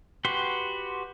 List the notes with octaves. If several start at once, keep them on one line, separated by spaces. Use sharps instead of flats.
F#4 G4 B4 C6